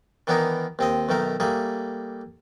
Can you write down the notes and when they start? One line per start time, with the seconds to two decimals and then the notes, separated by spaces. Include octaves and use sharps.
0.27 D#3 E3 B3 D4 D#4 A#4
0.79 D#2 C4 D#5
1.09 B1 D#3 A3 A#4
1.40 G3 A3 A#3 G#4